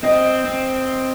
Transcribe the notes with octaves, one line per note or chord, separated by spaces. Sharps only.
C4 D#5
C4